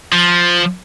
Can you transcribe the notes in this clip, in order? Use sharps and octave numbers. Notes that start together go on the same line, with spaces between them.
F3